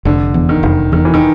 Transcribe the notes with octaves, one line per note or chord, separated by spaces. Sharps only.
F1 D3
E2
D#3
F1
E2 D#3
E3
D#3